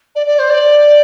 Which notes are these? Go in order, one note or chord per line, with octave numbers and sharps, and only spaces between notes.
D5
D5
C5
D5